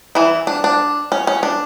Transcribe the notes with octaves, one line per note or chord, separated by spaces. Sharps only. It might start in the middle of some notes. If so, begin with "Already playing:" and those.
E3 E4
D4
D4
C#4
C#4
D4